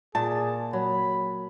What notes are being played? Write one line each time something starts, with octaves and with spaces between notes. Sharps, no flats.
A#2 G#4 A5
F#3 B5